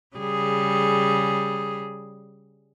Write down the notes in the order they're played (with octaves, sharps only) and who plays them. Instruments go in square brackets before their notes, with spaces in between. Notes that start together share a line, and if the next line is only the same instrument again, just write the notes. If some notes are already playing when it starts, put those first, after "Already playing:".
[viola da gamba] C#3 G3 G#4